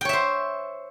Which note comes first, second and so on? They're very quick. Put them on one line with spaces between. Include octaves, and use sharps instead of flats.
G5 C#5 E5 C5